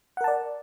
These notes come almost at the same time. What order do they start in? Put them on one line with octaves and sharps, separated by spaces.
F#5 A#4 A5 D5